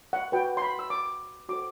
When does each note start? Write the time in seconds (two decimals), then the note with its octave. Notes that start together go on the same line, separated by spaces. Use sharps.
0.13 F#5
0.32 F#4 B4 G5
0.57 C6
0.62 B5
0.79 E6
0.90 D6
1.49 F#4 A4 C5 D6